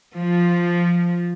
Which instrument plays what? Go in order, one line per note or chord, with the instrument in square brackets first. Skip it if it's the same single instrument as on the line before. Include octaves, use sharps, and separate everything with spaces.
[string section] F3